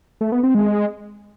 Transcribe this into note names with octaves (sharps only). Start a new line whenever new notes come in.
A3
B3
C4
G#3